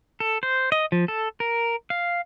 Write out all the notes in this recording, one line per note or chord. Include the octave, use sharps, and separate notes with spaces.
A4
C5
D#5
F3
A4
A#4
F5